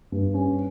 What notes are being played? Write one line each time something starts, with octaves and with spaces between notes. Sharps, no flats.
G2
C#4